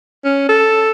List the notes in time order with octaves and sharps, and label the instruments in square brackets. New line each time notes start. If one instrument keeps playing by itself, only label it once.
[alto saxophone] C#4
A4